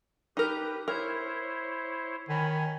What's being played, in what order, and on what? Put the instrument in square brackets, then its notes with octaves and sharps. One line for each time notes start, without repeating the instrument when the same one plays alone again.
[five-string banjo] D#4 A#4 [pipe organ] G4 B4
[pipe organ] E4 C5 C#5 [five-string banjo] A#4
[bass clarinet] D#3 [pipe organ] C#5 G#5 B5